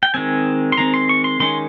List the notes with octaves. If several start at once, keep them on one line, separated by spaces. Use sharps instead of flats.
G5
D#3 G#3 C4 G#5
C6
D#3 G#3 C4 A#5
C6
C#6
C6
D#3 G#3 C#4 C6